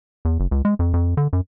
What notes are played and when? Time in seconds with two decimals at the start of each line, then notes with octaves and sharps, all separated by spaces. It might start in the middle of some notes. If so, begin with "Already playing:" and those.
0.25 E2
0.40 F#1
0.51 C#2
0.65 G#3
0.79 F2
0.94 F2
1.17 D3
1.33 F#2